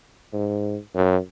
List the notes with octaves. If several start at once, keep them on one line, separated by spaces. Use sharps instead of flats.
G#2
F#2